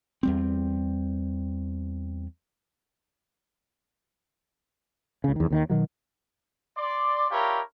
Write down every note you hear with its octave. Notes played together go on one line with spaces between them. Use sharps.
E2 G3 C4
C#2 C#3
E2 D#3
D#2 D#3
B2 D#3 F#3
D5 C6
D4 E4 F4 G4 A#4 C#5